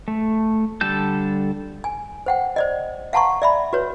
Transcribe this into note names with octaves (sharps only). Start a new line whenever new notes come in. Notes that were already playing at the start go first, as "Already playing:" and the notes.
A3
D3 G3 A4 A5 G6
G#5
C5 F#5 G5
C5 D5 D#5
F5 F#5 A5 A#5 C6 C#6
D5 E5 B5
F#4 B4 C#5